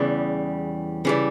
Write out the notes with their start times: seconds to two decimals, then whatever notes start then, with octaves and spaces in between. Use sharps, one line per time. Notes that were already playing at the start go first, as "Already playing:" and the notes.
Already playing: E2 C#3 E3 G3
1.05 C#3 E3 G3